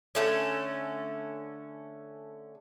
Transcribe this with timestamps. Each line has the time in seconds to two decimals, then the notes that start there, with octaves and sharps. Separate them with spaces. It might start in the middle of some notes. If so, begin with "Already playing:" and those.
0.15 D3 A3 C#4